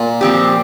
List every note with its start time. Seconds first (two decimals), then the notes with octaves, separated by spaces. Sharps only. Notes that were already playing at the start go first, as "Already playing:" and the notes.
Already playing: A#2
0.21 F3 C4 G4